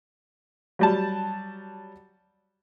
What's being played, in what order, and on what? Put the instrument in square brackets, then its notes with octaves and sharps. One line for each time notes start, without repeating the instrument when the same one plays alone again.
[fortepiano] F#3 G3 A5